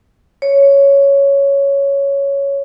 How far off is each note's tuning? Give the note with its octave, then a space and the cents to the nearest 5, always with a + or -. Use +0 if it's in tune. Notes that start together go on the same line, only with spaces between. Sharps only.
C#5 +5